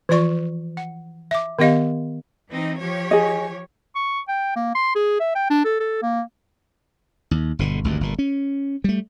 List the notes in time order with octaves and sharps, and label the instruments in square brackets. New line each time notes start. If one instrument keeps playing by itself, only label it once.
[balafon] E3 F3 F4 D5 C#6
F#5
E5 D6
D#3 B3 G4 D#5 F5
[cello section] E3 C4 D#4
F3 G4 C#5
[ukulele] G#4 D#5
[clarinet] C#6
G5
A#3
C6
G#4
E5
G5
D4
A4
A4
A#3
[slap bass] D#2
G1 B2 D3
G#1 D2 G2
G1 A#2
C#4
G3 A3